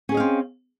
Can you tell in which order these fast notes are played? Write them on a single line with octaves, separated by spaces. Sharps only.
C#4 G#4 D#5 F5 C4